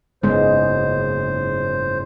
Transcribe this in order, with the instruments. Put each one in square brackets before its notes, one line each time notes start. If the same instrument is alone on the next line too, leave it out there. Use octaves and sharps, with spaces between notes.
[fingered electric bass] F#1 G#2 C#3 [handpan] G#3 B3 [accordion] C5